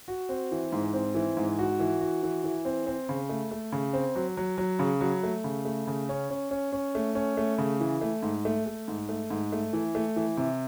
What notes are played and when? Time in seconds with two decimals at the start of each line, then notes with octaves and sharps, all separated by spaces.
0.08 F#4
0.29 C4
0.51 E3
0.72 G#2
0.94 C4
1.15 E3
1.37 G#2
1.59 F#4
1.79 E3
2.01 F#4
2.23 E3
2.44 E3
2.65 C4
2.87 C4
3.09 C#3
3.29 A3
3.51 A3
3.72 C#3
3.93 C4
4.15 F#3
4.37 F#3
4.58 F#3
4.79 C#3
5.01 F#3
5.23 A3
5.44 C#3
5.65 A3
5.87 C#3
6.09 C#4
6.30 C#4
6.51 C#4
6.72 C#4
6.95 A3
7.15 C#4
7.37 A3
7.58 C#3
7.80 E3
8.01 A3
8.23 G#2
8.45 A3
8.66 A3
8.88 G#2
9.09 A3
9.31 G#2
9.52 A3
9.73 E3
9.95 A3
10.16 E3
10.37 C3